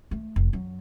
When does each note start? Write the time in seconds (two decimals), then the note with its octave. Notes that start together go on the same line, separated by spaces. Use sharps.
0.11 A3
0.36 F1
0.53 F#2 F#3